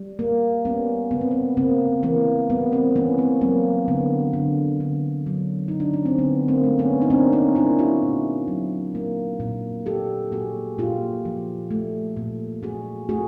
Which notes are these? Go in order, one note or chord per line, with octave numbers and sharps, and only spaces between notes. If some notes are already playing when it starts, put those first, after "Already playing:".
Already playing: G3
A#3
G3 B3 C#4
C#3 B3
C4
B3
C#3 A#3 C4
E3 A#3
G3 B3
A#3 C4
E3 B3 C#4
A#3 C4
F#3 A#3 C4
D3 B3
D3
D3
F#3
D3 D#4
D4
C#4
C4
D3 B3
A#3 C4
A3
B3 C#4
D#4
A#3 C4 D4
C#4 D#4
A#3 D4 E4
E4 F#4
A#2
F#3
A#3
A#2
A#2 G4 A4
A#2 F#4 G#4
A#2 F4 G4
F3
A3
A#2
A#2 F#4 G#4
A3 F#4 G#4